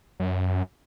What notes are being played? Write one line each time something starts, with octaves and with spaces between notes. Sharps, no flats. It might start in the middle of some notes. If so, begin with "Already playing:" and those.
F#2